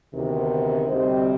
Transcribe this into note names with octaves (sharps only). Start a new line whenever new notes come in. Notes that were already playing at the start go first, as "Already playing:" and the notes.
D2 C3 D#3 B3
D2 C3 G3 C4 C5 D#5